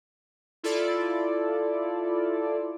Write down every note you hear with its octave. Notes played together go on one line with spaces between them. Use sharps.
E4 F4 A4 D5